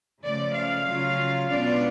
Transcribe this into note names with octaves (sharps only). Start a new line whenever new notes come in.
C#3 F3 A3 D5
F5
C#3 F#3 C#4 F4
B2 G#3 B3 D4 F4 D5